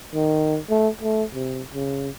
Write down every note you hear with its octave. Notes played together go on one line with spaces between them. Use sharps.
D#3
A3
A3
C3
C#3